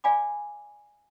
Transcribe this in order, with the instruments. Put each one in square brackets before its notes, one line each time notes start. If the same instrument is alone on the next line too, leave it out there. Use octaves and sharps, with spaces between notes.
[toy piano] D5 F5 G#5 B5 D6